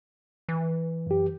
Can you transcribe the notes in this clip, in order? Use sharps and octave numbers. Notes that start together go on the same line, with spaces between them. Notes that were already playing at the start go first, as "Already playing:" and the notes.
E3
F#2 G4